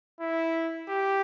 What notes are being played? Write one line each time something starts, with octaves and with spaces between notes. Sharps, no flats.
E4
G4